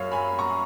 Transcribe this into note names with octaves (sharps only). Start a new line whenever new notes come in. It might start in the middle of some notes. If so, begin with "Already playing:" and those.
Already playing: F#2 F#3 C#5 F5
G#5 B5
A#5 C#6